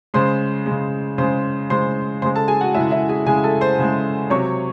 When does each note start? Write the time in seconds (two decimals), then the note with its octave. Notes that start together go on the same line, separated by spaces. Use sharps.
0.14 C#3 G#3 C5 C6
0.66 C#3 G#3
1.18 C#3 G#3 C5 C6
1.70 C#3 G#3 C5 C6
2.22 C#3 G#3 C5 C6
2.35 A4 A5
2.48 G#4 G#5
2.61 F#4 F#5
2.74 C#3 G#3 E4 E5
2.91 E4 E5
3.09 G#4 G#5
3.26 C#3 G#3 G#4 G#5
3.44 A4 A5
3.61 C5 C6
3.79 C#3 G#3
4.30 C3 F#3 C#5 C#6